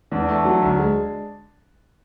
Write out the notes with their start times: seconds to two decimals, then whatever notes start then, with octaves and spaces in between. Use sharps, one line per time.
0.11 E2 D4
0.28 A3
0.45 F#3
0.62 D2
0.79 G#3